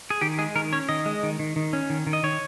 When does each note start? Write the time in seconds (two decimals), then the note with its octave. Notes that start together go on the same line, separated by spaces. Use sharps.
0.10 G#4
0.21 D#3 G4
0.38 G#3 G#4
0.55 D#3 A#4
0.73 C#4 C#5
0.89 D#3 D#5
1.06 G#3
1.23 D#3
1.39 D#3
1.56 D#3
1.73 C#4
1.90 D#3
2.07 D#3
2.13 D#5
2.23 D#3 C#5